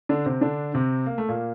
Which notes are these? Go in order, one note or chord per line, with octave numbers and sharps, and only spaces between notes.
D3 D4
C3 C4
D3 D4
C3 C4
A#3
A3
A#2 A#3